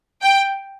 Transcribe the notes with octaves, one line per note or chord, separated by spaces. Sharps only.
G5